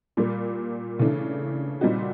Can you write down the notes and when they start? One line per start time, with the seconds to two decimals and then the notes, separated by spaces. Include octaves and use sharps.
0.17 A#2 G3 A#3
0.99 C#3 E3 A3 D4
1.81 A#2 G3 C4 D#4 F#4